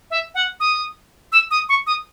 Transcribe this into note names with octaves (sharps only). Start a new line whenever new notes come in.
E5
F#5
D#6
E6
D#6
C#6
D#6